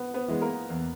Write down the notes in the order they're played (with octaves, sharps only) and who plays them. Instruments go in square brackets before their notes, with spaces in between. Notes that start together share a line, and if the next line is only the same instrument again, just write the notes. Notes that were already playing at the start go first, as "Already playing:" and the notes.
Already playing: [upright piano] B3 B4
B3 B4
[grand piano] E3 G#3 B3
[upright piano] A#3 A#4
[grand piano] E2